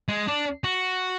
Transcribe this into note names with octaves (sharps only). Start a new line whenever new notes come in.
G#3
D4
F#4